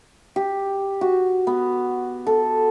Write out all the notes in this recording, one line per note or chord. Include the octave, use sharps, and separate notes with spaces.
G4
F#4
B3
A4